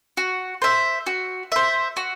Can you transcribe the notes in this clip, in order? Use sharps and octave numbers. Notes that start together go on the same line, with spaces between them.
F#4
C5 E5
F#4
C5 E5
F#4